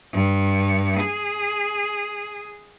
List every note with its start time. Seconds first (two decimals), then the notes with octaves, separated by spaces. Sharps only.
0.12 G2
0.99 G#4